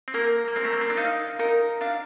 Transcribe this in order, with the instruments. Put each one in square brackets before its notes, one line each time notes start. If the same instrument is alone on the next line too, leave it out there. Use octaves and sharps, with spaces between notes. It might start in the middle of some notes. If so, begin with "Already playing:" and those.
[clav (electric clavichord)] C4
[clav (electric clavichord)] A#3 [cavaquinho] A#4
[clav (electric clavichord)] A#3
[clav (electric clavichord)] C4 [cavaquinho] A#4
[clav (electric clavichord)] A3
A#3
C4
D4
[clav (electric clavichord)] D#4 [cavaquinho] F5
[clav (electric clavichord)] D#4 [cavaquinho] A#4
[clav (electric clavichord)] D4 [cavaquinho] F5